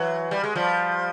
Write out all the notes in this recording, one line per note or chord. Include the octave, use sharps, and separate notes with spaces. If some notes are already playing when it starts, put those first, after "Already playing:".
Already playing: E3 F#3
G3
G#3
F3 G3